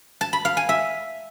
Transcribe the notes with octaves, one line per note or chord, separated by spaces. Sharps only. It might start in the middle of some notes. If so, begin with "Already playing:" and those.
A5
B5
F5
G#5
E5